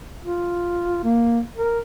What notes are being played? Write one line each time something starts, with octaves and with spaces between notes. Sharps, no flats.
F4
A#3
A#4